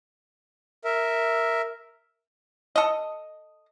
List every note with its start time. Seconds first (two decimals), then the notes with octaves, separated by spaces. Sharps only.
0.85 A#4 E5
2.76 A4 D#5